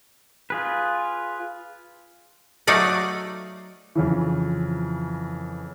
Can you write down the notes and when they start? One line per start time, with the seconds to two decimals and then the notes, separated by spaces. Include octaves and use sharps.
0.50 F4 G#4 B4
2.67 F#3 A3 D#4 D5 F5 F#5
3.95 F2 C#3 E3